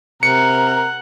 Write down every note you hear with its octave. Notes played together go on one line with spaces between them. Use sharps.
C3 A#4 F#5 C#7